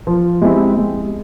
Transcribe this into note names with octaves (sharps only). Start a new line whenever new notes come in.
F3
G#3 C4 E4 G4
G#3